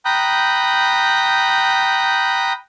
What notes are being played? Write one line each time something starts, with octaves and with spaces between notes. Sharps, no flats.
G5 A#5 B5 D#6 F#6 G6